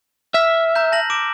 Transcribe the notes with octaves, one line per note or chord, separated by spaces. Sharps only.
E5 E6 F6 B6
A#5 G6
A5 A#6 F#7
D6 D7 E7